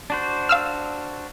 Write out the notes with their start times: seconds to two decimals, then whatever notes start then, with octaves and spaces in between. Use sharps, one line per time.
0.10 D4 F#4 C5
0.49 F5 E6 F6